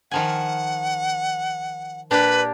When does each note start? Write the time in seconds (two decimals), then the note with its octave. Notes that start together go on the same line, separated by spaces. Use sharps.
0.11 D#3 F3 F#5 G#5
2.11 A#2 D4 G4 B4